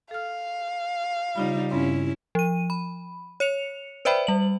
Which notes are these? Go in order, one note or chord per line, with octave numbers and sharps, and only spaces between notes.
A4 F5 F6
C#3 G3 D#4 F4 B5
G2 C#3 C4 C#4 E4
F3 D#7
B5
C#5 C#7 F7
B4 C5 D5 E5 G5 B5
G3 F#7